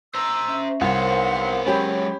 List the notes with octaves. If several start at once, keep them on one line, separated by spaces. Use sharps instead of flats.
C5 A#5 E6
C#4 E5
C2 B3 A#4 C5 C#5 F5 F#5 C6
F#3 G#3 C#4 G4 C#5 B5